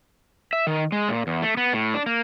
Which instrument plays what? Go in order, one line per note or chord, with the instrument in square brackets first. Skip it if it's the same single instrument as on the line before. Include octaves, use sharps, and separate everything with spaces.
[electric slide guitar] E5
D#3
G#3
A#2
E2
A3
B3
A2
D4
A#3